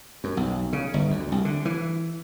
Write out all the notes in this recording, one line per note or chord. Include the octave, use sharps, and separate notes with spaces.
F#2
B1
C#3
G1
D2
C2
D3
E3